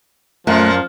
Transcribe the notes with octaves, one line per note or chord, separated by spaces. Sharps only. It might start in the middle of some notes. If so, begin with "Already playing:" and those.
F#2 A#2 F3 A3 F#6